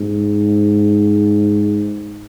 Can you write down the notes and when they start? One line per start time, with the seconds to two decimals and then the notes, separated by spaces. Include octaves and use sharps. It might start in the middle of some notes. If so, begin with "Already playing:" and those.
Already playing: G#2